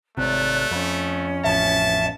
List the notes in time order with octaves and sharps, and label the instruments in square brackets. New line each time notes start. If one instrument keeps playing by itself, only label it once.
[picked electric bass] G#1 C3 [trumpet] A3 [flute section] C#5 D5 F#6
[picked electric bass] F2 [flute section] C#4
[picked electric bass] A1 F2 [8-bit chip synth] E5 [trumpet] A5